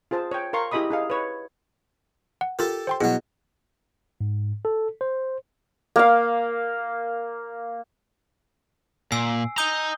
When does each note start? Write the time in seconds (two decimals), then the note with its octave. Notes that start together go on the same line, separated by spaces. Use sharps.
0.11 F4 G#4 C5 A5
0.31 C#5 G5
0.53 A#4 F5 C6 C#6
0.71 E4 G4 G#4 D#5 B5 D#6
0.90 D#4 G#4 F5
1.10 B4 C#5
2.41 F#5
2.59 F4 G4 A4 A#4
2.87 C5 G5 C6
3.01 B2 F#3 E4 G#4
4.21 G#2
4.65 A4
5.01 C5
5.96 A#3 F5
9.12 A#2 G#5 E6 C7
9.58 D#5 A#5 D#6 G6 G7